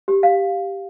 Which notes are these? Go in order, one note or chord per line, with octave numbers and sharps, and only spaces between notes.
G4
F5